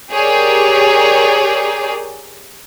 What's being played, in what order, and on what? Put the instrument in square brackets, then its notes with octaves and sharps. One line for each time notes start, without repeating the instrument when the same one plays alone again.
[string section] G4 G#4 A#4 C#5 D5